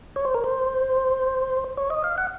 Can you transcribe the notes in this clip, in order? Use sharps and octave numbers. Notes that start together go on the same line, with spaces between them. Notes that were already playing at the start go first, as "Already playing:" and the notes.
C#5
C5
A#4
C5
C#5
D#5
F5
F#5